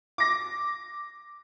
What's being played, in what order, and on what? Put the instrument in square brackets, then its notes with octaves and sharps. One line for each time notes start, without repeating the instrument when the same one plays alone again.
[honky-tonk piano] D6 A#6